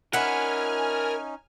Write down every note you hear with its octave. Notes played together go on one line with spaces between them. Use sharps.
C#4 D#4 A#4 E5 F#5 G#5 B5 F6